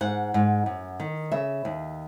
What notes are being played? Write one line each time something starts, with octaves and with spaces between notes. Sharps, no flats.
G#2 F#5
G#2
F#2
D#3
C#3 E5
D#2